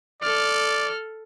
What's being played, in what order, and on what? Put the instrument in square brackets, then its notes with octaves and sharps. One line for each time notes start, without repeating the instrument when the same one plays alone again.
[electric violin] A4 F6 [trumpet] D5